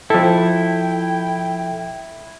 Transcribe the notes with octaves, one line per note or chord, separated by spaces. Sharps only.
F3 E4 A4 G5